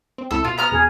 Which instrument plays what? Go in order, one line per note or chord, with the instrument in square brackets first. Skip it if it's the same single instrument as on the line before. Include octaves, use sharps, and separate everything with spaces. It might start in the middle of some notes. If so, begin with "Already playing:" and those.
[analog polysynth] C4
[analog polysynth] C#2 E4 E7 [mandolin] A4
[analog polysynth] B2 [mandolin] F4
[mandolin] B3 A#5 F6
[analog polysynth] E2 B2 [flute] G#4